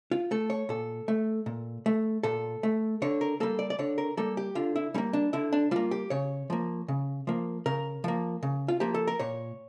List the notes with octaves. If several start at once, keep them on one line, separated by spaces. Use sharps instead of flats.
F4
A3 A4
C#5
A#2 A4
A3
A#2
A3
A#2 A4
A3
D3 C#5
A#4
G3 A#3 A4
D5
D5
D3 C#5
A#4
G3 A#3 A4
G4
D3 F4
E4
G3 A#3 C#4
D4
D3 E4
D4
G3 A#3 F4
G4
C#3 C#5
F3 A#3
C#3
F3 A#3
C#3 A#4
F3 A#3
C#3
F4
F3 A#3 G4
A4
A#4
A#2 C#5